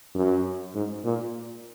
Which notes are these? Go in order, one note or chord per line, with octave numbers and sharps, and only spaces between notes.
F#2
G#2
A#2